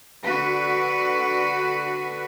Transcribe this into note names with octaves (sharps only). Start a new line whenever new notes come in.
D3 F#4 B4